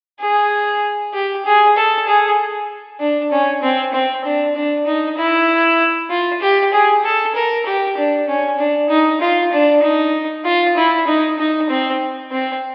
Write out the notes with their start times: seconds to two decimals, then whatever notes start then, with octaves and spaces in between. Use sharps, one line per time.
0.20 G#4
1.14 G4
1.45 G#4
1.76 A4
2.07 G#4
3.00 D4
3.31 C#4
3.62 C4
3.93 C4
4.24 D4
4.55 D4
4.86 D#4
5.17 E4
6.10 F4
6.41 G4
6.73 G#4
7.04 A4
7.35 A#4
7.66 G4
7.97 D4
8.27 C#4
8.59 D4
8.89 D#4
9.21 F4
9.53 D4
9.82 D#4
10.45 F4
10.77 E4
11.07 D#4
11.39 D#4
11.70 C4
12.31 C4